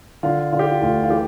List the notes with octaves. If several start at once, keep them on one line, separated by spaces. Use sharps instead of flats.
D3 F4
D3 F4
G4
F4
D2 F4
F4
E3 G4